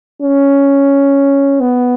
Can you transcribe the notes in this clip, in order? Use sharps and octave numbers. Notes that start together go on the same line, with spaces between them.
C#4
B3